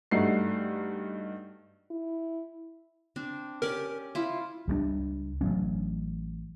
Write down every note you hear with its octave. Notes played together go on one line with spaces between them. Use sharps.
G2 A3 D#4 F#4 C7
E4
C4 D4
C#4 G4 A#4 D5
E4 F4
C#2 G3 G#3 D4
A1 D#3 F#3 C#4